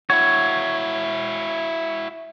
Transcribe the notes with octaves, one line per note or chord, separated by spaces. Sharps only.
E4 F#4 C#5